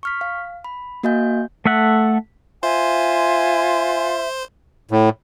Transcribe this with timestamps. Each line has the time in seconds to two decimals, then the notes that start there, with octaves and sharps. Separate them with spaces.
0.03 C#6 F6 B6
0.21 F5
0.65 B5
1.03 A#3 F#4 D#5 F5 G#5 G6
1.65 A3 A4 E5 F#5
2.63 F4 C5 E5 G#5
4.91 A2